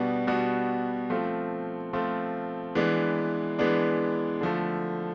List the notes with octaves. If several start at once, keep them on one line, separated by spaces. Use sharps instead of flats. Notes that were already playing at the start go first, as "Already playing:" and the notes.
Already playing: B2 G3 B3 D4 F#4
B2 G3 B3 D4 F#4
F3 A3 C4 F4
F3 A3 C4 F4
E3 G#3 B3 D4
E3 G#3 B3 D4
D3 F3 A3